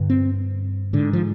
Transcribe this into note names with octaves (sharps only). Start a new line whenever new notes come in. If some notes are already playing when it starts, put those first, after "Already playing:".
Already playing: G2 D3
C4
G#2 D3
F3